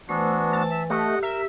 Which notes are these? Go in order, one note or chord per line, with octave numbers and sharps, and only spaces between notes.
E3 A3 B3 D4 F#4 C5 E6
A5
E5
A3 G4 D#5 F#5
A#4 E5